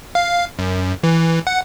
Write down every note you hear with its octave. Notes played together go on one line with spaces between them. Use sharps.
F5
F#2
E3
F#5